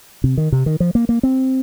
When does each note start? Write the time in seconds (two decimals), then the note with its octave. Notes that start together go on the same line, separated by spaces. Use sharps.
0.24 C3
0.37 D#3
0.52 C3
0.66 D#3
0.80 F3
0.95 A#3
1.09 A#3
1.23 C4